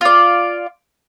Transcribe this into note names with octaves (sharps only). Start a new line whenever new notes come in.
F4 D5